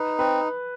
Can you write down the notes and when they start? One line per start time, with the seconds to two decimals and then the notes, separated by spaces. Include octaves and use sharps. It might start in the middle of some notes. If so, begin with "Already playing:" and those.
Already playing: D#4 B4
0.19 C4 B4